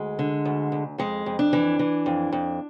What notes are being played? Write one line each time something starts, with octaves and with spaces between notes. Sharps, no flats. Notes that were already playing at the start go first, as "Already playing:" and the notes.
Already playing: D2 G#3
D3
D2
D2
F2 G#3
F2
D4
E3
E3
F2
F2